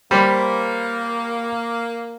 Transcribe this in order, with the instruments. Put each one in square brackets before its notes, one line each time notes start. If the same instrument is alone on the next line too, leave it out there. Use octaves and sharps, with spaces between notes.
[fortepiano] G3 [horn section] A#3 [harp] C5 C#5 B5